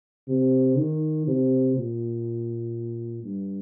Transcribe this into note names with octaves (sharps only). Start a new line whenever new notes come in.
C3
D#3
C3
A#2
G2